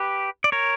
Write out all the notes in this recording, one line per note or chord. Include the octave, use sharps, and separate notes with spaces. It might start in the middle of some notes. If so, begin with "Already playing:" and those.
Already playing: G4 B4
D5
A#4 C#5